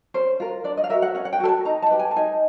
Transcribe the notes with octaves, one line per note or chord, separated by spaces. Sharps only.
C#4 C5
F4 A#4
D4 D5
D#5
F5
F#4 A#4 E5
F#5
C#4 F#5
F#5
G5
F#4 A4
A5
D#4 A#5
A5
G4 B4
G#5
A5
D#4 G#5